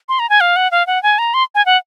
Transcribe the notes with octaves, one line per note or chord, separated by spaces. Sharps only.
C6
A#5
G#5
F5
F#5
F5
F#5
G#5
A#5
C6
G#5
F#5